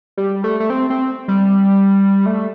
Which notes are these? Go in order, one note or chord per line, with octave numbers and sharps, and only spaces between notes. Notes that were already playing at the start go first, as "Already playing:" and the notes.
G3
A3
A3
C4
C4
G3
A3